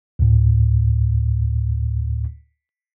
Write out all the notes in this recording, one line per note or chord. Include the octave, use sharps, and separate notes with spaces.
D2 A2